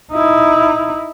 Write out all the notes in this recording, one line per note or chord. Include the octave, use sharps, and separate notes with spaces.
D#4 E4